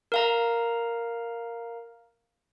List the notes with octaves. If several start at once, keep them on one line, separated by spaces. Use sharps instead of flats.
A#4 F5 A#5